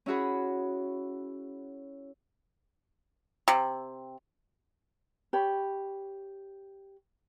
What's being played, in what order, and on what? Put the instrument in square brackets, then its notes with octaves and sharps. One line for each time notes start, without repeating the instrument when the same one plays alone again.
[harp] C#4 E4 F#4 G#4 B5
[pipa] C3
[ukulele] G4 C#5 B5